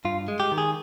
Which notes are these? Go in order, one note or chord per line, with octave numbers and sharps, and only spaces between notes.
G2 F4
G#3
G4
D#3
G#4